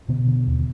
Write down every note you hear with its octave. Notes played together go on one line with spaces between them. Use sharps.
B2 D3 B3
D3
D#2